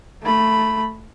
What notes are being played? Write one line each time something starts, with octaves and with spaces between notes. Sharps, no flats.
A3 B5